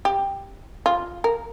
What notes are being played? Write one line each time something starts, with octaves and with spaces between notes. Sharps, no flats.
G4
F4
A#4